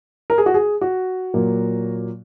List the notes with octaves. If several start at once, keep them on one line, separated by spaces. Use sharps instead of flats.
A#4
G#4
F#4
G#4
F#4
A#2 F#3 A#3